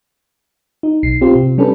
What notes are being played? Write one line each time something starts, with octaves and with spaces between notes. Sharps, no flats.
D#4
B1 C7
C4 F4 G4 C5
C3
G3 C#4 D4 A4 B4